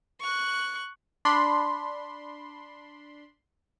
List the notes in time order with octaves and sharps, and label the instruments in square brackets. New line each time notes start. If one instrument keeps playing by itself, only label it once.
[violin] C#6 F#6
[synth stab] D4 B5 C6